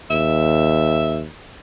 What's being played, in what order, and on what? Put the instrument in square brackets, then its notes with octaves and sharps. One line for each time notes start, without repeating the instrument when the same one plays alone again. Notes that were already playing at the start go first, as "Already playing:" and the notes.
[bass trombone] D#2 [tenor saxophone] E5